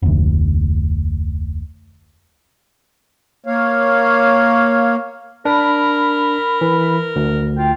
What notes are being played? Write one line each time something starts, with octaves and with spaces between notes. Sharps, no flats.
F1 D2
A#3 C#5 F5
D4 A#4 B5
E3
D2
F4 G5